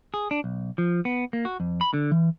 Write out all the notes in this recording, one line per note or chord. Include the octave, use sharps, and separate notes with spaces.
G#4
D4
B1
F3
B3
A#3
F#4
F2
B5
D3
E3